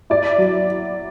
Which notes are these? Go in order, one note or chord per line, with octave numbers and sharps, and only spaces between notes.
E4 D5
F#3